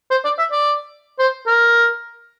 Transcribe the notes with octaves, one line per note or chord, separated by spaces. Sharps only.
C5
D5
E5
D5
C5
A#4